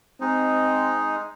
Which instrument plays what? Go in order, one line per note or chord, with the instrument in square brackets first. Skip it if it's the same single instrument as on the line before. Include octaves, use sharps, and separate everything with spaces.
[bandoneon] G#3 D#4 [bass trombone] C4